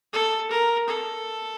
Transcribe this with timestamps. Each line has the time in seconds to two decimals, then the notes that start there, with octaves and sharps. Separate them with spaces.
0.13 A4
0.51 A#4
0.88 A4